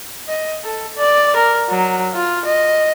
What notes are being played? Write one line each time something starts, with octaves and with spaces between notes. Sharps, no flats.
D#5
A4
D5
A#4
F#3
F4
D#5